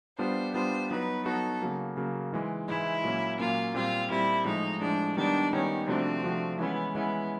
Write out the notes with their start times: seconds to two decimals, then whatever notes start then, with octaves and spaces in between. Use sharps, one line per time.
0.19 G3 B3 D4 F4 C5
0.55 G3 B3 D4 F4 C5
0.91 F#3 B3 D#4 F#4 B4
1.26 F#3 B3 D#4 F#4 A4
1.62 C#3 F#3 A#3
1.97 C#3 F#3 A#3
2.32 G#2 E3 G#3
2.68 G#2 E3 G#3 E4
3.04 A#2 F#3 A#3 C#4
3.39 A#2 F#3 A#3 C#4 F4
3.74 A#2 G3 C4 F4
4.10 A#2 G3 C4 E4
4.45 A2 F3 G#3 D#4
4.81 A2 F3 G#3 D4
5.17 D#3 G3 B3 D4 D#4
5.53 D#3 G3 B3 C#4 D#4
5.87 C3 F3 A3 C4 D4 F#4
6.23 C3 F3 A3 D4 F#4
6.59 E3 G#3 B3 C#4 E4
6.94 E3 G#3 B3 C#4 E4